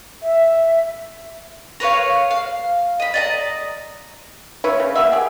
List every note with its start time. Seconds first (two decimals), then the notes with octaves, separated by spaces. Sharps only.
0.22 E5
1.80 A#4 B4 C#5 F5
2.31 F5
3.00 D#5 B5
3.14 D5 D#5 A#5
4.64 A#3 E4 B4 C#5
4.80 C#3
4.95 A#3 B3 F#4 E5
5.12 G4 G#4